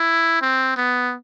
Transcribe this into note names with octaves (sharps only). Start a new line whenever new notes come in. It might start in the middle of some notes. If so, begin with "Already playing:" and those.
Already playing: E4
C4
B3